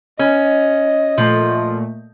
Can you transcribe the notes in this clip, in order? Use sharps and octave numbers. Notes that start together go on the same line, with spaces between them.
C#4 D#5
A#2 F3 A3